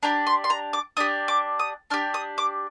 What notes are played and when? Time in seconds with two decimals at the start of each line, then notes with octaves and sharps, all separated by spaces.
0.03 D4 G4 A#5
0.27 C6
0.44 C6
0.50 A#5
0.73 D6
0.97 D4 G4 D#6
1.28 D6
1.59 D#6
1.90 D4 G4 F6
2.14 D#6
2.38 D6